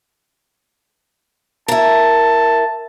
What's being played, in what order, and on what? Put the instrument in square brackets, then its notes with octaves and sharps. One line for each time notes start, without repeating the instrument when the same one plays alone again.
[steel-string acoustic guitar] E4 A#4 [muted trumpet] A5